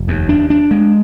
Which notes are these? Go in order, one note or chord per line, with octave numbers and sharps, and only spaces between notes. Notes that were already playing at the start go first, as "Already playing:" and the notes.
Already playing: F1
D#2
D4
D4
G#3